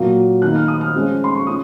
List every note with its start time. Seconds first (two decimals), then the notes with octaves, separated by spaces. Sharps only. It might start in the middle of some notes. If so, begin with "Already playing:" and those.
Already playing: A#2 F#3 A#3 F4
0.41 D#3 A#3 D#4 F#6
0.55 F6
0.68 D#6
0.81 F6
0.95 F3 G#3 C#4
1.24 C6
1.35 C#6
1.47 C#4 F4 D#6